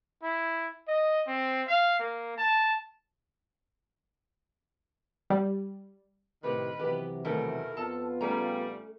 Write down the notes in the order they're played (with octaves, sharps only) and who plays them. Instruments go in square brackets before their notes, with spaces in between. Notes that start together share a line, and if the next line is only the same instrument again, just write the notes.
[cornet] E4
D#5
C4
F5
A#3
A5
[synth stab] G3
[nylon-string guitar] A2 C3 G4 [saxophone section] D#3 B4
[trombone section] C3 E3 F#3 [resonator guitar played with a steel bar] B3 [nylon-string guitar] G4 G5
[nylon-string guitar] E2 A3 A4 [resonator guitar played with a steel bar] B2 D#3 [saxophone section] A#3 E4 A#4
[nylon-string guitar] F2 [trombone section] B3 F4 [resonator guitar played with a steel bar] A4 A5
[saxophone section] F2 C#3 G3 [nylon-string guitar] A3 [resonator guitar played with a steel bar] C#4 A#5